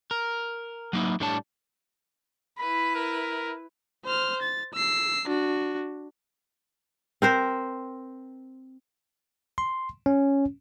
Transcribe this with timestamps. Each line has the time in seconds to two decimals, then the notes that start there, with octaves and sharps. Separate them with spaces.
0.11 A#4
0.93 F#3 A#3 D#4 E4
1.20 A2 G3 D4 C#5 A5
2.58 E4 B4 B5
2.95 A#4
4.05 C5 F6
4.42 A6
4.73 E6 C7
5.28 D4 F#4
7.22 C4 A#4 C5
9.58 C6
10.06 C#4